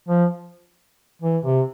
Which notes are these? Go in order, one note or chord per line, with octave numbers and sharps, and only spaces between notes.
F3
E3
C3